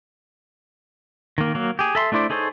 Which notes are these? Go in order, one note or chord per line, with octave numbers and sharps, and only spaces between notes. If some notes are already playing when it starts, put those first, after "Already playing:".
D#3 A#3
F#3 A#3
G4 G#4
A4 E5 B5 C6
A3 D4 E4 C5 D5
D#4 G#4 A4 C5 C#5